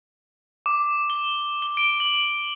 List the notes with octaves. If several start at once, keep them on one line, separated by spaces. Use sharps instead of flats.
D6
G7
G7
D7
F#7